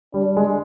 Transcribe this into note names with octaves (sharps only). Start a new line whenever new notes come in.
G3 D4
G#3